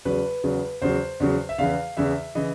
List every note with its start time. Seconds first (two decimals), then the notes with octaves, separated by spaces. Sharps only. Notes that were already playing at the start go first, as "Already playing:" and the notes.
0.05 E2 C#3 F#3 B4
0.44 E2 C#3 F#3
0.82 E2 C#3 F#3 C5
1.20 E2 C#3 F#3
1.49 E5
1.58 E2 C#3 E3 F5
1.97 E2 C#3 E3 E5
2.35 C#3 E3 D#5